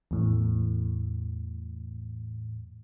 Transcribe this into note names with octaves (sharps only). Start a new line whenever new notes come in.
E2 A2